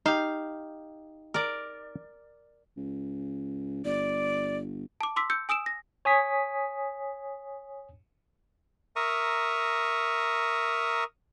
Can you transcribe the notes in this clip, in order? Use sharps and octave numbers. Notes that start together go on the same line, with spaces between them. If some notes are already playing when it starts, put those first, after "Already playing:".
D#4 G4 F5
A#4 D5
C#2
G1 D5
A5 D6
C6 D6 E6 B6
E6 G6 C#7
G#5 D#6 E6 D7 E7
A#6
C#5 G#5 D#6 B6
A#4 E5 A#5 C#6 D#6